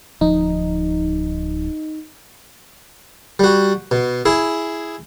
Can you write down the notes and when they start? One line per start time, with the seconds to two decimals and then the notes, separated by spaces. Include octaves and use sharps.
0.21 D1 F3 D#4
3.39 G3 F#4
3.91 B2
4.25 E4 G#4